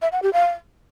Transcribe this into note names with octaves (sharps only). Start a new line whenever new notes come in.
E5
F#5
G4
F5